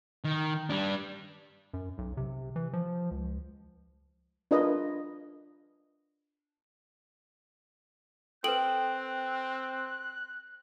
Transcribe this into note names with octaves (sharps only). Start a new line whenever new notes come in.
D#3
G3 D4
F#2
B1
C3
E3
F3
C#2
D4 F4 A#4 B4 D#5
C4 A4 B4 G5 F#6 F#7